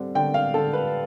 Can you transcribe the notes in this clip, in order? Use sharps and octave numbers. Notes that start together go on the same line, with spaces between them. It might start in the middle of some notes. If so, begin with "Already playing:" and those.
Already playing: D3 G3 C4
D3 G5
F5
D3 A4
B4